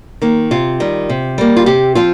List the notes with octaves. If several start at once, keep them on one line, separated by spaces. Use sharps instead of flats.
D#3 A#3
C3 F4
D#3 G3
C3
G3 A#3
F4
C3 G4
F3 C4 F4